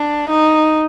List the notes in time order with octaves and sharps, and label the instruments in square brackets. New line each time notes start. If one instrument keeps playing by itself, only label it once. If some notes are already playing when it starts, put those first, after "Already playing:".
Already playing: [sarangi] D4
D#4